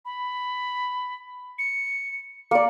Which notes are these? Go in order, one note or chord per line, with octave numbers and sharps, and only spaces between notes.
B5
C#7
A#3 D5 C#7